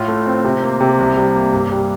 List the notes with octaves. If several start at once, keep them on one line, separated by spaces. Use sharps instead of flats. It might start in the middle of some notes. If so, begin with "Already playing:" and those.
Already playing: A2 F4
A3
C4
C3
A#3
C3
C2
G3
A#3
G2
G3